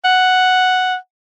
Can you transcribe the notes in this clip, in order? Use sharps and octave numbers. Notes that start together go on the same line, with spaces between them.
F#5